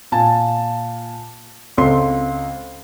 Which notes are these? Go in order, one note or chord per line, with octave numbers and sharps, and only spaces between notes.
A#2 G#5 A5
C#2 C4 A4 C6 C7